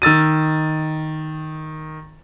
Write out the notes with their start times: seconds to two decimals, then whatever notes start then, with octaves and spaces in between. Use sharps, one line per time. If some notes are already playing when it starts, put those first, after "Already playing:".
0.02 D#3 E6 A6 D#7